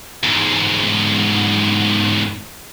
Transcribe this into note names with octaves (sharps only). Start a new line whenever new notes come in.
E2 G#2